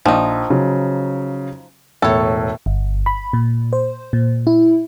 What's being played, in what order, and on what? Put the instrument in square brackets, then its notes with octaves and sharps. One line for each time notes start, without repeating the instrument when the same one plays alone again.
[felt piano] A#1 [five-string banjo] F3 D#4
[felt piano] C#3 F#3
[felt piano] E1 A2 [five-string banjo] A4 C#5
[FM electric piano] G1
B5
A#2
C5
A#2
E4